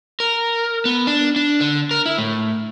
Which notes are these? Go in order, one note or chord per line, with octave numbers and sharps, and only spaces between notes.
A#4
B3
D4
D4
D3
A#4
E4
A2